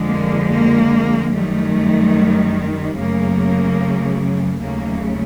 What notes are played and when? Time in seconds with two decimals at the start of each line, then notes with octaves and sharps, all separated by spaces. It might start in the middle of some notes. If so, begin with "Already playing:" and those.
Already playing: F2 D3 F3 G#3
0.10 A#3
0.51 A#3
1.33 F#2 D#3 G3 A3
2.97 F#2 C#3 F#3 A3 A#3
4.60 D#2 C#3 F#3 A3 A#3